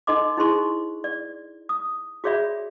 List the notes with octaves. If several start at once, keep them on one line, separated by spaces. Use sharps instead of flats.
D#4 A4 D#5 C6 D6
D#4 E4 G#4 C5 C6 C#6
D5
D#6
F#4 G#4 C#5 D5 E5 B5